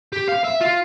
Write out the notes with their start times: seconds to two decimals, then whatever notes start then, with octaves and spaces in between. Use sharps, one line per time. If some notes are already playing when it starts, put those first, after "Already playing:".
0.13 G4
0.29 F5
0.45 E5
0.61 F4